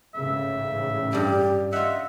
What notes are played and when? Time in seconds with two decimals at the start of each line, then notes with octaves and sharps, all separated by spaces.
0.15 A1 G#2 C#3 E5
1.13 G2 G3 G4
1.73 F4 D#5 E5 F#5